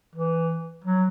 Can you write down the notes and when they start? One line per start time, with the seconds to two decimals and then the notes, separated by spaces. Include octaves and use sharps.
0.15 E3
0.84 F#3